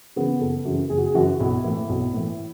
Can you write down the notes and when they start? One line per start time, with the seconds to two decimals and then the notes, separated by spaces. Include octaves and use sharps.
0.16 C#3 E3 B3
0.40 F#1 A4
0.65 F#2 C#3 E3
0.90 F#1 G#4
0.98 F#4
1.06 G#4
1.15 F#2 C#3 E3 F#4
1.40 B1 E4
1.64 A2 E3 E4
1.89 B1
2.14 A2 E3